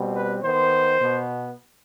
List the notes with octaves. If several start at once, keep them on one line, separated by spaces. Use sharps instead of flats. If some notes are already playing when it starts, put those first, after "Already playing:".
Already playing: B2 G3 C4
B4
D#3 B3 C5
B2 B3